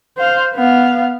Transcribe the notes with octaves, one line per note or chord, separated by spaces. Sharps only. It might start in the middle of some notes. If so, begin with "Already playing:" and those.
C5 F5
B3 F5